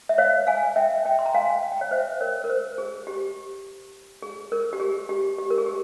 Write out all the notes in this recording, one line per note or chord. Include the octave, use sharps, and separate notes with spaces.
E5
C#5 F5
F5 G#5
E5 G5
E5 G5
C6
A#5
F5 G#5
F5
G5
C#5 F5
C5 E5
A#4 C#5
A#4
C5
G#4
G4
G#4
A#4
G4
G#4
G4
G4
A#4
G#4
G4